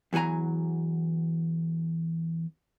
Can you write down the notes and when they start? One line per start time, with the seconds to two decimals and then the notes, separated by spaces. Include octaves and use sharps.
0.13 E2 E3 F#3 G#5 A#5